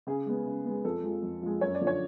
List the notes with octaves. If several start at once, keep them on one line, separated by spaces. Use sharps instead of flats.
C#3 G#4
G#3 B3
C#3
G#3 B3
F2 A4
F3 G#3
F2
F3 G#3
F#2 C#5
D5
D3 F3
C#5